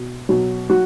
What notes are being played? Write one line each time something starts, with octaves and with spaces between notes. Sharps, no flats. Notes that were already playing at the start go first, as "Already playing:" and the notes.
Already playing: B2
B2 F#3
F#3 F#4